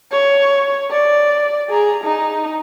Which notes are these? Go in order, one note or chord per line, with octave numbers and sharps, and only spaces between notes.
C#5
D5
G#4 A#5
D#4